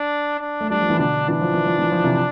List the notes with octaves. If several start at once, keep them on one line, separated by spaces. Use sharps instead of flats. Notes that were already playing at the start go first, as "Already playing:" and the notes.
Already playing: D4
D4
A3
G3 D4
F3
E3
B2 D3 D4
E3 D4
F3
E3
F3
E3
F3
C3 E3